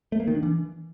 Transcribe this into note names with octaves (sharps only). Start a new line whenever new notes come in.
A3
A#3
D#3
D4
E3